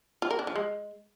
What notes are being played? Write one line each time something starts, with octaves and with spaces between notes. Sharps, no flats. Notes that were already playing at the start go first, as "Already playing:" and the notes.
F4
A#4
D4
F3
G#3